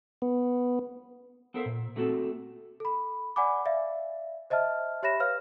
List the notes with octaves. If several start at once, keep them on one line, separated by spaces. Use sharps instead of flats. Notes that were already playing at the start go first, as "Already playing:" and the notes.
B3
B3 A4 A#4 C5 E5 F5
A#2
A3 A#3 C4 F#4 G4 A4
A4 B5
D5 F#5 G#5 B5 D6
D5 E5 F5
C5 D#5 E5 A5 F6
G4 C#5 E5 B5 A#6 E7
B4 C#5 F5 F6